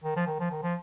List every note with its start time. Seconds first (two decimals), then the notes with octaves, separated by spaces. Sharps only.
0.04 D#3
0.16 F3
0.27 D#3
0.39 F3
0.51 D#3
0.62 F3